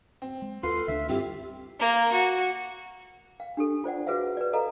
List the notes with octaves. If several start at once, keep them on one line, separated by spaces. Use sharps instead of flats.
C4
G#3
D#2 F4 A4 B4 C6
D2 C#4 D4 E5
G2 C4 E4 F4 G4 E5
A#3
F#4
F5
D4 G4 A4
F4 C5 D5 F#5
F#4 G#4 B4 C5 E5 F5
B4 D5
A4 D#5 F5 A#5